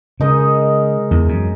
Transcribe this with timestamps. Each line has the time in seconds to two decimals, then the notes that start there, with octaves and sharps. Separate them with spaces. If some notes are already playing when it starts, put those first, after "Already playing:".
0.20 C#3 G#3 D#4 A#4 D#5
1.11 E2
1.29 F#2